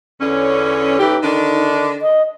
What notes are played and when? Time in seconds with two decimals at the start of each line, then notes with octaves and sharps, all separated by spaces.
0.21 E2 D3 C#4
0.99 A2 E3 D#4 G4
1.23 D3 D#3 D4
2.02 D#5